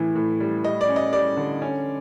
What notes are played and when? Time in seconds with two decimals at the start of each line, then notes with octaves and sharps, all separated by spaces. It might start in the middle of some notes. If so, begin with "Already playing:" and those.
Already playing: A2 E3
0.15 A2
0.40 G3
0.64 G3 D#5
0.81 D5
0.89 C#4
0.96 D#5
1.13 G3 D5
1.37 D3
1.62 C#4